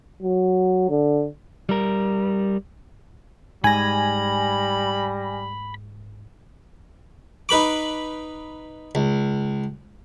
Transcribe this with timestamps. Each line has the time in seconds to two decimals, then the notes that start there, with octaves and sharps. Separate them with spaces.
0.23 F#3
0.90 D3
1.69 G3 A#4
3.64 G#2 G3 G#5 B5 A#6
7.49 D#4 B4 B5 D6
8.95 C#2